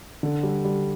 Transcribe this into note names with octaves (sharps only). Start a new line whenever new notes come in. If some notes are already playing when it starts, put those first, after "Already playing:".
D3
G3
G3